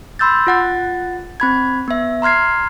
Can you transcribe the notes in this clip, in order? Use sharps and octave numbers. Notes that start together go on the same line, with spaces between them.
B5 C6 E6 G6 A6
F4 F#5 A6
C4 B5 G#6
B3 E5
A#5 C6 F6 G#6 C7